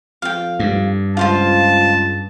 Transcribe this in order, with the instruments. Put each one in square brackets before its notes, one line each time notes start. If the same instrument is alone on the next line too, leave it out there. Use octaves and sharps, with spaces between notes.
[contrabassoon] F2 [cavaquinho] F5 G5
[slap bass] G2
[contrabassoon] C#2 [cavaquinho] F4 C5 F5 [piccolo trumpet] A5